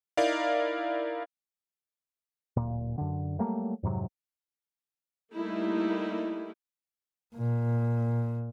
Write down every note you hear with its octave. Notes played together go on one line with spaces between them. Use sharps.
D#4 E4 A#4 D5 F5
D1 A#2
F#2 D3
F#3 G3 A3 A#3
F2 G#2 C3 F#3
G3 A3 A#3 D#4 E4
A#2